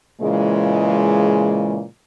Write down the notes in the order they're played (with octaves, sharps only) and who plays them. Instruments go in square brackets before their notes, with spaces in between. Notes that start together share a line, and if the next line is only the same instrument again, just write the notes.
[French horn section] A#2 C#3 E3 G#3